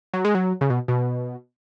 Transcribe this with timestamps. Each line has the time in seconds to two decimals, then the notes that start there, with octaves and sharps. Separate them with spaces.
0.13 F#3
0.25 G#3
0.35 F#3
0.61 C#3
0.70 B2
0.88 B2